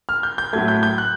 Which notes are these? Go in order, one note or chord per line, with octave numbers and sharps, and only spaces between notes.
F6
G6
G6
A2 F#3 A3 G#6
G6
G6
F#6